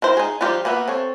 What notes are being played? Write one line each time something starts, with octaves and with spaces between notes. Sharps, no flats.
D#3 E4 C5
D#4 G#4
F3 G3 D#4 F4 G4
A#3 B3 B4 E5
C4 A4 C#5